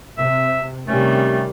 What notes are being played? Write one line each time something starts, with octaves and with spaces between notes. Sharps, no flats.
C3 E5
C3 D#3 G3 A3 C#4